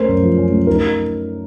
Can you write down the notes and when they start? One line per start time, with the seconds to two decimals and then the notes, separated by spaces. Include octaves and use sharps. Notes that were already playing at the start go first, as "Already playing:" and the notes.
Already playing: A3 C#4 A#4 C5
0.08 F#2
0.23 F3
0.37 C#4
0.52 A3
0.67 D#4 A#4